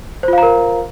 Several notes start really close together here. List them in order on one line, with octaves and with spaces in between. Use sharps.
C5 F4 F5 A#5 A#4